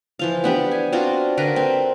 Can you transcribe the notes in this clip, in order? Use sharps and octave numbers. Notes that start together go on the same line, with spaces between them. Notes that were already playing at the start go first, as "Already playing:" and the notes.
E3 F3 F5
B3 D4 G4
G#5
C4 D4 F4 F#4
D3 A#4 B4
C4